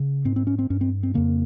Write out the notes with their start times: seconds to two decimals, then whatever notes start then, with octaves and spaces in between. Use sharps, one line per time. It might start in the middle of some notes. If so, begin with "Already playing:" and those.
Already playing: C#3
0.25 G#2 C4
0.36 C4
0.47 C#4
0.59 C4
0.70 G2 C#4
0.81 C4
1.03 C4
1.14 F2 C#3 A#3